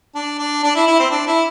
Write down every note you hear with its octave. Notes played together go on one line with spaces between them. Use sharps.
D4
D4
D4
E4
E4
C4
D4
E4